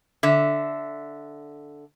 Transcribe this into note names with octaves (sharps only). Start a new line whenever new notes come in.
D3 E5